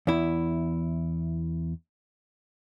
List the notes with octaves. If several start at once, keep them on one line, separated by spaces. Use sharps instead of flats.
E2 E4